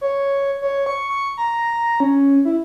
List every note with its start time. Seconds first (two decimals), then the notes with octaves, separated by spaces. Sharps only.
0.01 C#5
0.62 C#5
0.86 C#6
1.09 C#6
1.37 A#5
2.00 C#4
2.45 E4